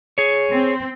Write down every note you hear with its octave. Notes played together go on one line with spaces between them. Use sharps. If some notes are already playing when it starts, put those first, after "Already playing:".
G#4 C#5
C4